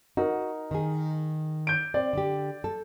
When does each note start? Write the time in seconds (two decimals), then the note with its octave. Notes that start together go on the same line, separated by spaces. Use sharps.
0.17 D#4 F#4 A#4
0.71 D#3 G#4
1.67 G6 D7
1.94 C4 D5
2.13 D3 G4
2.64 A4